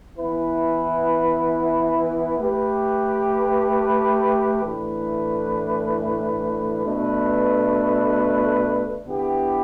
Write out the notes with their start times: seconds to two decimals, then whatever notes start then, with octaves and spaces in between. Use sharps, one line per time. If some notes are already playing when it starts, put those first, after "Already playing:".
0.18 E3 B3 E4 B4
2.40 A3 G4 B4
4.62 A2 E3 A3 D4 B4
6.84 B2 A3 D4 B4
9.06 D3 B3 E4 G4 B4